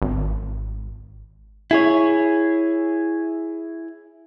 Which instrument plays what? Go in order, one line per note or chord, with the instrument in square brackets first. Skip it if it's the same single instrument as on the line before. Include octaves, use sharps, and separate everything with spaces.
[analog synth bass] G#1
[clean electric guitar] E4 G#4 C#5